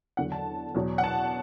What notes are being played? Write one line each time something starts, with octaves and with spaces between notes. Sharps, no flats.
E2 D3 F#3 F#5
A5
E2 B2 F#3
F#5
A5